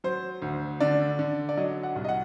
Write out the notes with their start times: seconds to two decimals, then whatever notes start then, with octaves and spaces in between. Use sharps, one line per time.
0.04 F#3 C5
0.42 D2
0.80 D3 D5
1.19 D3
1.49 D5
1.57 F#3 D#5
1.83 F#5
1.96 C2
2.04 D#5
2.09 F#5